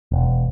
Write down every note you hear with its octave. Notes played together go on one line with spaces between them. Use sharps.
E1